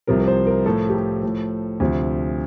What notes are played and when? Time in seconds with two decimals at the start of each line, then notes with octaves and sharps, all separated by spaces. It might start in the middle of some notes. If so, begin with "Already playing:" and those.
0.07 C2 C3 F3 A#4
0.20 A#4
0.27 C5
0.47 A#4
0.65 A2 F3 A4
0.89 G4
0.94 A4
1.23 A2 F3
1.80 D2 C3 F3